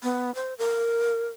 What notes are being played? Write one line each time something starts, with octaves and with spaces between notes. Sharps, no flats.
B3
C5
A#4